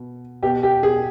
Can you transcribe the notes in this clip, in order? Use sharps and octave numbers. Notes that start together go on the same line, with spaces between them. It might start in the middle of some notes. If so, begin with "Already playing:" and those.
Already playing: B2
B2 G4
G4
G#4